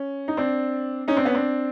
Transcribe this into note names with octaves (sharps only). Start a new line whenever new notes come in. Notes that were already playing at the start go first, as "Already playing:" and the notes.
Already playing: C#4
D#4
C4 D4
C#4 D#4
C4 D4
B3 C#4
C4 D4